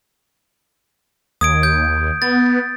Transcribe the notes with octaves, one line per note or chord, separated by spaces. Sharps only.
D#2 D#6 G#6 D7
G6
B3 A6